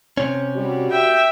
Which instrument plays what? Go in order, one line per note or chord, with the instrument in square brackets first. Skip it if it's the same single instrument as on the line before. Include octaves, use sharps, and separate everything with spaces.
[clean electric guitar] C3 C#4
[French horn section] G3 F#4
[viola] E5 G5